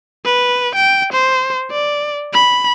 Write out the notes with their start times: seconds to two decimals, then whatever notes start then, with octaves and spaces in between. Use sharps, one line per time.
0.25 B4
0.75 G5
1.13 C5
1.71 D5
2.33 B5